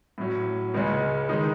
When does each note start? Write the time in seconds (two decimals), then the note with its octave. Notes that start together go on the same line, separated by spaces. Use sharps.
0.18 A2 F#3 C#4
0.74 C#2 C#3 G#3 C#4
1.29 D#3 G#3 D#4